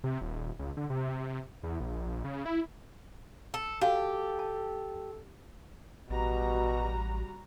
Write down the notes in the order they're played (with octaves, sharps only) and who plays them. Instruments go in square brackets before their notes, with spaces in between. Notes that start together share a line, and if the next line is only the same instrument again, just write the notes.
[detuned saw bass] C3
D#1
C#2
D3
C3
E2
A#1
C#3
E4
[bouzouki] A4
[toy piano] F#4 F5 A5 [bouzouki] G4 [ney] A4
[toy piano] A5
[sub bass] A1 [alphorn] B2 [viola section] G3 F#4 A#5